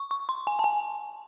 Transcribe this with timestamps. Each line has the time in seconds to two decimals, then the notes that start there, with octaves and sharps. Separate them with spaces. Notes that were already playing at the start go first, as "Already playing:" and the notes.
Already playing: C#6
0.11 C#6
0.29 C6
0.47 G#5
0.59 A5
0.64 G#5